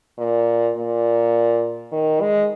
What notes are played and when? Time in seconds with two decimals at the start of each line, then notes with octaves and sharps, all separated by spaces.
0.18 A#2
0.76 A#2
1.92 D#3
2.21 G#3